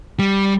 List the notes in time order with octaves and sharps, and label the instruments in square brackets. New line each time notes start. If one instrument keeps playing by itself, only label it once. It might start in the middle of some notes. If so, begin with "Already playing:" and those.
[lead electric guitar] G3